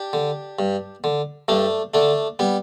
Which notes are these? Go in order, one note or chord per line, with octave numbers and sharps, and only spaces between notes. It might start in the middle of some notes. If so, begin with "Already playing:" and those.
Already playing: D4 G4
D3
G2
D3
G2 A3 D4
D3 A3 D4
G3 B3